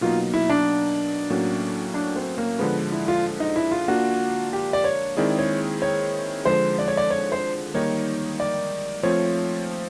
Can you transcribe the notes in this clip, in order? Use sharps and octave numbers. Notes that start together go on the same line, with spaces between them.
B2 F#3 A#3 D#4 F4
E4
D4
A2 F#3 A#3 C#4 F#4
D4
C4
A#3
D3 F3 G#3 B3
E4
F4
D#4
E4
F4
A#3 D4 F4 F#4
G4
D5
C#5
D#3 G#3 C4 E4 G#4 D5
C#5
C#5
D3 F3 G#3 C5
D5
C#5
D5
C#5
C5
D#3 G3 A#3 D#4 C#5
D5
F3 A3 C4 F4 C#5